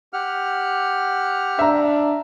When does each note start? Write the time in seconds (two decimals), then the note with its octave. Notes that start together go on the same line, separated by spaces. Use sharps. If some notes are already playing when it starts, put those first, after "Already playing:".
0.13 G4 F#5 F6
1.59 D4 E5 A#5